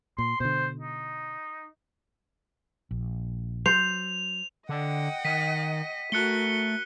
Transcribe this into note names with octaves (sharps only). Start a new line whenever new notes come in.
A#2 C6
B2 D3 C5
D#4
A#1
F#3 C5 F7
D3 D#5 F#5 G5
D#3 B6 D#7
A3 F#4 A#4 F#6 C#7 G7